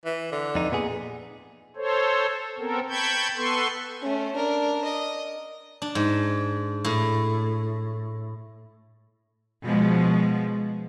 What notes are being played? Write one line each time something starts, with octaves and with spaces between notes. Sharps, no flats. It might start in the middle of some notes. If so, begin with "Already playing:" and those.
E3
D3
F2 D#4
A#2 B3 G#4
A4 C5 C#5
B3 C4 A4 A#4
G5 A5 B5 C#6 G6 G#6
B3 A4 B4 C6 C#6
A3 C#4
D4 A#4
D#5
D4
G#2
A2
B2 F3 G#3